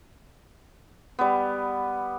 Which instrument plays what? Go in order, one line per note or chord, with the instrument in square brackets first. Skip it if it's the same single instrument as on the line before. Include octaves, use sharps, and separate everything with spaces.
[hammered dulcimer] G3 B3